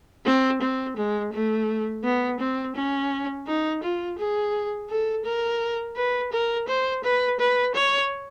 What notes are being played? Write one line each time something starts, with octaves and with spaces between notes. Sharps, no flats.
C4
C4
G#3
A3
B3
C4
C#4
D#4
F4
G#4
A4
A#4
B4
A#4
C5
B4
B4
C#5